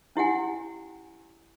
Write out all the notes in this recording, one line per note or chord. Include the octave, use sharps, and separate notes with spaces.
C#4 E4 G4 F#5 G#5